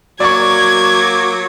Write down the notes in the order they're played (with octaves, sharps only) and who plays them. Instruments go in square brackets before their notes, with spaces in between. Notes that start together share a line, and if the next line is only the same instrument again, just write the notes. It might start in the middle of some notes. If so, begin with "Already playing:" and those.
[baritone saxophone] F#3 [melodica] A#3 D6 [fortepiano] D5 C#6 [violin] G#6